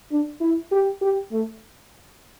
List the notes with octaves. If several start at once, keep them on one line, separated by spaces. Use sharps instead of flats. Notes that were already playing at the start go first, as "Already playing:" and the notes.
D4
E4
G4
G4
A3